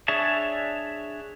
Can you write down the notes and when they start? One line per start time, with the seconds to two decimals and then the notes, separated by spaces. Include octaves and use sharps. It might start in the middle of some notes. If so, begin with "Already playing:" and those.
0.08 D4 G#4 C#5 E5 A5